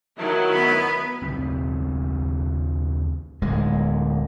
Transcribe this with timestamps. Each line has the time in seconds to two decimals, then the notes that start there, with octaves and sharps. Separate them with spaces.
0.19 D#3 F#3 E4
0.52 B3 B4
1.22 D#2 C#3 F#3 C4
3.42 D1 G#3